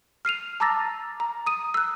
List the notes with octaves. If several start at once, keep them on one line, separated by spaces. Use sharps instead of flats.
F6 C7 D#7 F7
A5 A#5 D6 E6 A6 A#6
A#5
D#6 D#7
E6 F#6